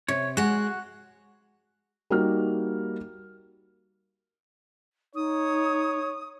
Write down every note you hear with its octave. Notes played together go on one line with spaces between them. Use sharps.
C3 C#5
G#3 F#4 F#5
G3 A#3 D#4 F#4 F6
D#4 C#5 D#6